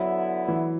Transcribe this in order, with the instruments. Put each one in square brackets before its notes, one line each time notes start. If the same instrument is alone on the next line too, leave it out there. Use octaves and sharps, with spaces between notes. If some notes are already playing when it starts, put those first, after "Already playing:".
Already playing: [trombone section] D3 B3 E4 [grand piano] F#3
[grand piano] E3